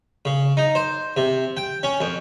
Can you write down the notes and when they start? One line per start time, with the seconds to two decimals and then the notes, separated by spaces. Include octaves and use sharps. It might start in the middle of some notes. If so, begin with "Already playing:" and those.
0.25 C#3
0.57 D#4
0.75 C5
1.17 C3
1.57 G5
1.83 C#4
2.01 F2